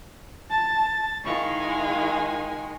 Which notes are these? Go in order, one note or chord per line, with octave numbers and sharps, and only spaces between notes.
A5 A6
D#3 G#3 E4 F5 C#6
G#5